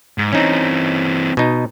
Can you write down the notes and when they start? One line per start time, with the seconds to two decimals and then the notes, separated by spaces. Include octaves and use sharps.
0.18 G#2
0.33 E3 C4 C#4 D#4
1.37 B2 D#4